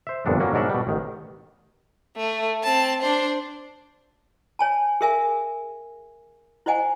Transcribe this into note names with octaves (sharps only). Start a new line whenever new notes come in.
C5 E5
G1 F2 A#2 B3 D4
F#3 G3 A#3 C#4 F#4
G#2 B2 D4 A#4 E5 F#5
B2 G3
A1 D#3
A3
C4 A5
D4 C5
C#5 G#5 A5
G#4 A#4 E5 F5 G#5
E4 C5 D#5 F#5 G#5